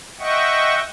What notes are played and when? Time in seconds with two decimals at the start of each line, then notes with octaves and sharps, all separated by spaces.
0.19 D#5 E5 F#5 G5 C#6